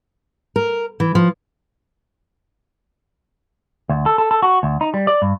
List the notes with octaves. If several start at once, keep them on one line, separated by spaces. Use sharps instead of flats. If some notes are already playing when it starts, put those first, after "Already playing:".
A#4
E3
F3
D2
A4
A4
A4
F#4
D2
D#4
G3
D5
G2